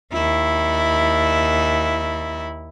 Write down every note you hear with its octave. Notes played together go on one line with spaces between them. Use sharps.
D#2 E4